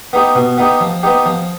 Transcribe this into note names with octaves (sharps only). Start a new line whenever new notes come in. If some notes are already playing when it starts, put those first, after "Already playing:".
B3 D#4 G4
B2
B3 D#4 G4
F3
B3 D#4 G4
F3